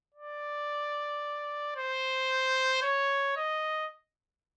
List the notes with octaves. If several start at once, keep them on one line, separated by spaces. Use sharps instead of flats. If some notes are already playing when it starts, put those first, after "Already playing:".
D5
C5
C#5
D#5